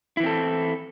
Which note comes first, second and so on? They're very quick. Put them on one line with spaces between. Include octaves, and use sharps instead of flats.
E4 E3 C4 A4